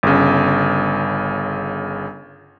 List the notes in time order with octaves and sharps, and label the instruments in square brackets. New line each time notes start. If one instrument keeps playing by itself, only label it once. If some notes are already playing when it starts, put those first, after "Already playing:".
[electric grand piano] G1 C#3